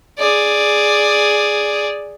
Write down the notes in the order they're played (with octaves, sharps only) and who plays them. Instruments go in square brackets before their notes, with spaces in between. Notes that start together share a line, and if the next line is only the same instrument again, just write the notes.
[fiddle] G#4 D5